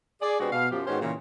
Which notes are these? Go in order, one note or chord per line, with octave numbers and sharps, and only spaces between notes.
G#4 D5
C3 G#3 B3 C4 D4 F#4
B2 F5
F#2 F3 G4
G#2 D#3 B3 C#4 F#4 C5
A#2 C#3 E3